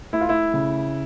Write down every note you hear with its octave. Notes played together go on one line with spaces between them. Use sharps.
A3 E4
F4
E4
C#3